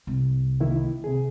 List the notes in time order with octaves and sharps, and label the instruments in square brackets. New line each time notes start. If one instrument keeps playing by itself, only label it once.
[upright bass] C2
[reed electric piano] D#3 A#3 E4
C3 G#4